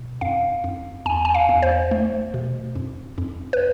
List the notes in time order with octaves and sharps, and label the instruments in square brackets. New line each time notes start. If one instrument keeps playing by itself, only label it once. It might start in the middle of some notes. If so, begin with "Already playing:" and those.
Already playing: [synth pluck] B2
F2 F5
F2
E2 G#5
G#5
F5
E2
C5
A3
B2
F2
F2
B4